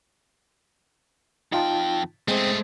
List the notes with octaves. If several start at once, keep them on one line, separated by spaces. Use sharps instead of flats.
F2 D#4 F4 G5 A5
G#3 A3 C4 G#4 C5